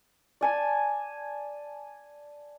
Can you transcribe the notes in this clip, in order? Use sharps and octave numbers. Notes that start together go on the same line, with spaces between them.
D5 G#5 A5